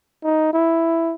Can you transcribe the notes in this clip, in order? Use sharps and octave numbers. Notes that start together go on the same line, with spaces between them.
D#4
E4